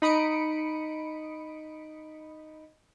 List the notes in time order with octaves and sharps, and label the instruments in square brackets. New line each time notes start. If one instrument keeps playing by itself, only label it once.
[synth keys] D#4 B5 D#6 C#7 D7